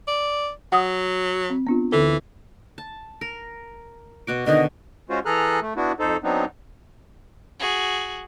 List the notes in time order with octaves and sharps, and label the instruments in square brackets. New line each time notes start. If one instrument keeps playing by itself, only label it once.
[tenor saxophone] D5
[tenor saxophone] F#3 [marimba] F#5 D#6
[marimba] C4
B3 D4 F4
[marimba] D2 D3 A4 [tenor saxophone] E3
[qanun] A5
A#4
B2 F#4 D6
[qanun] B2 D3 D#3 [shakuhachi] D#5
[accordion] G#3 C#4 F4 F#4 C5
E3 G#4 A4 A#5 F6 F#6
A3
B3 D4 E4 F#4
F2 D#4 A4 C5
F#3 B3 C4 D4 D#4
[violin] F#4 G#4